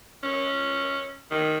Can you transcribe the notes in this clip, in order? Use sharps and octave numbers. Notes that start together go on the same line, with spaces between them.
C#4
D#3